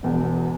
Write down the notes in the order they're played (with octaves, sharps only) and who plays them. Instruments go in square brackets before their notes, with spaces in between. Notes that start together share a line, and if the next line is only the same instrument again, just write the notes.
[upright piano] E1 E2 B2